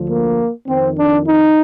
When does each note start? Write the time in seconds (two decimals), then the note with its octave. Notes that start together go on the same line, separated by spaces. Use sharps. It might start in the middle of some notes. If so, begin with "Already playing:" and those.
Already playing: D2 D3 F3
0.08 A#3
0.68 F2 D#3 C4
0.97 D4
1.26 D#4